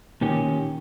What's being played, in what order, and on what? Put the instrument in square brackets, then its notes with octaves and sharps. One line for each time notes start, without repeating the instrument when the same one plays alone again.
[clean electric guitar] A#2 D#3 C#4 G4